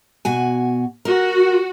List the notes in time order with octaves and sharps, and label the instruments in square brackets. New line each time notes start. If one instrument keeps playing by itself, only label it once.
[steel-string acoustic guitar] B2 F#4 G#5
[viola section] F#4 [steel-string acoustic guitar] A#4